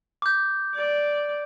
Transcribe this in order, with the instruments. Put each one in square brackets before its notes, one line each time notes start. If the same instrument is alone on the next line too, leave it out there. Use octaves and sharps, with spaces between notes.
[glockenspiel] D6 G6
[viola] D5